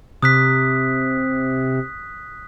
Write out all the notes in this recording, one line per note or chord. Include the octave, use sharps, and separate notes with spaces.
C3 D#6 F#6 B6